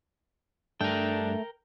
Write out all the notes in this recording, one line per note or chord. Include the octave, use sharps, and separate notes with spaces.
G2 A3 D4 A#4 G5